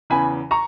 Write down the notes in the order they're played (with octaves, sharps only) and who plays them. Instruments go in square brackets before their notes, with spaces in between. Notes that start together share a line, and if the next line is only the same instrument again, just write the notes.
[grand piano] E2 C#3 E3 G#5 B5
A#5 C#6